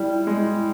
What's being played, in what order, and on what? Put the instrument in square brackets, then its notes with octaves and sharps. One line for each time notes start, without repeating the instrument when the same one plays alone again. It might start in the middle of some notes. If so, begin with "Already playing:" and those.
Already playing: [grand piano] G3 [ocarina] E4
[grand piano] G#3